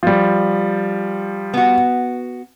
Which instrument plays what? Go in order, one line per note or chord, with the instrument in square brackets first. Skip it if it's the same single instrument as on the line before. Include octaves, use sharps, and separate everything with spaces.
[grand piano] F3 G3
[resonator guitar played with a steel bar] B3 F#4